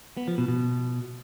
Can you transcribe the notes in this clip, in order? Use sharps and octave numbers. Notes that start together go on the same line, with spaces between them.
B3
F3
B2
B2